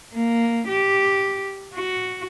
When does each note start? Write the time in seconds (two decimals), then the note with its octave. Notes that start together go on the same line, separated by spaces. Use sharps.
0.15 A#3
0.68 G4
1.75 F#4